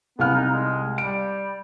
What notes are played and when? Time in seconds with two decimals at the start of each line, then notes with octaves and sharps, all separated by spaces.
0.19 C2 B3 F5 F6
0.35 D#4
0.51 G#3
0.98 G3 D7